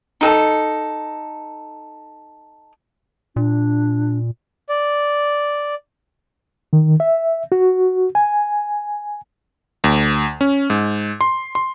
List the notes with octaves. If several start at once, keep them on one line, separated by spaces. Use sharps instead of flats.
D#4 G#4 A4
A#2 D4
D5
D#3
E5
F#4
G#5
D2
C#4
G#2
C6
C6